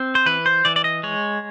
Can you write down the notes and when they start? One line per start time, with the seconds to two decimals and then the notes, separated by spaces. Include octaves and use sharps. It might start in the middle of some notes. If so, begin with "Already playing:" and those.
Already playing: C4
0.15 C5
0.26 E3 B4
0.46 C5
0.65 E3 D5
0.76 D5
0.84 D#5
1.03 G#3 C#5